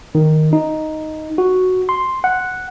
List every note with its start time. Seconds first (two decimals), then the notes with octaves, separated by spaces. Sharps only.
0.15 D#3
0.53 D#4
1.38 F#4
1.89 C6
2.24 F#5